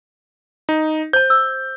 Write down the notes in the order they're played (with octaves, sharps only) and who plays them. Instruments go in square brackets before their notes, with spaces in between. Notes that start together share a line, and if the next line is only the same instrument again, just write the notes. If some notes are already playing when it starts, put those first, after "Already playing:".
[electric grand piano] D#4
[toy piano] C5 A5 [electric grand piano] G6
[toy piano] E6